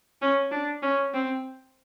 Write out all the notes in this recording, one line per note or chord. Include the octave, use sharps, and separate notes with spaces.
C#4
D4
C#4
C4